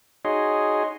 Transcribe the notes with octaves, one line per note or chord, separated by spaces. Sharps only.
D#4 F#4 G#4 C#5 D#5 C6